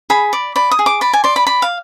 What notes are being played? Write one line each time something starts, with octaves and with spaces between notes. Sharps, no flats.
G#4 B5
D5
D5 B5
D#6
G#4
D6
D5 B5
G#5
D5 C6
B5
D5 B5
F5